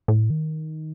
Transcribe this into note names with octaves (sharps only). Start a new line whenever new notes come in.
A2
D#3